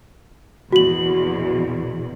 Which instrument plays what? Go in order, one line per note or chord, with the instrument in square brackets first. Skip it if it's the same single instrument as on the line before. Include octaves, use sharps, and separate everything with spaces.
[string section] A#1 E2 B2 [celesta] F#4 F#7